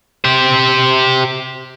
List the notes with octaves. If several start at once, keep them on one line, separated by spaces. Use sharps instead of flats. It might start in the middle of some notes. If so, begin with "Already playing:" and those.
G4 C5